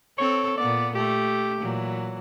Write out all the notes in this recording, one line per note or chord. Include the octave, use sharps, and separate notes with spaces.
C4 A4 C#5
A#2 B3 D5
A3 G4
A#2 E3 F#3